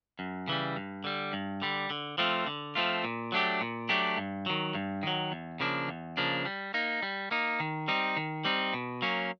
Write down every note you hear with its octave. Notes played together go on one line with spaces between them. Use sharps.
F#2
C#3 E3 G3
G2
D3 G3
G2
D3 G3
D3
F3 A3 C4 F4
D3
F3 A3 C4 F4
A#2
F#3 A3 D4 G4
A#2
F#3 A3 D4 G4
G2
D#3 F#3
G2
D#3 F#3
E2
C#3 F3 A#3 D4
E2
C#3 F3 A#3 D4
G3
A#3 D#4
G3
A#3 D#4
D#3
G3 C4 D#4
D#3
G3 C4 D#4
B2
F#3 A#3 C#4